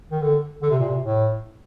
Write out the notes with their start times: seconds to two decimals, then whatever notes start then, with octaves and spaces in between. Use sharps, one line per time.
0.11 D#3
0.22 D3
0.62 D3
0.70 C3
0.79 A#2
0.89 C3
1.02 A2